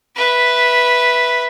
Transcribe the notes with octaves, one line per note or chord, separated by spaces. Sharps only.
B4 E5